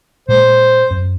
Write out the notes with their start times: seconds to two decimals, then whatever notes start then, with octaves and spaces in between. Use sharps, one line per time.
0.28 A#2 G#3 C5
0.91 F#2